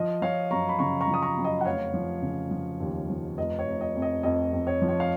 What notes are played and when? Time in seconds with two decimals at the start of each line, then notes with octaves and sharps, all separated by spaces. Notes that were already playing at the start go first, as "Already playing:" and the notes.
Already playing: F3 D#5
0.22 F3 C#5 F5
0.51 F#2 A#5 C#6
0.69 B5
0.79 C#3 A#5 C#6
1.01 A#5 C#6
1.08 F3
1.14 D#6
1.22 A#5 C#6
1.37 F#2
1.44 D#5
1.61 F#5
1.65 F1 C#5 F5
1.94 F3
2.22 C#3
2.51 F3
2.80 D#2
3.10 F3
3.38 F1 D#5
3.59 C#5
3.66 F1
3.81 D#5
3.96 F2
4.02 D#5
4.23 F2 D#5
4.53 F2
4.67 C#5
4.81 F3
4.88 C#5
5.00 F5